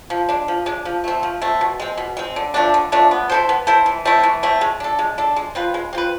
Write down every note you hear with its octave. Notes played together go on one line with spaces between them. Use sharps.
F3
G#3 D4
F3
G#3 D4
F3
A3 C4
F3
A3 C4
B2
G#3 C4
B2
G#3 C4
D3
F3 A3 D4
D3
F3 A3 D4
B3
E4 A4 C5
B3
E4 A4 C5
E3
A3 C4 E4
E3
A3 C4 E4
G#3
D4 A4
G#3
D4 A4
G#3
C4 F4 B4
G#3
C4 F4 B4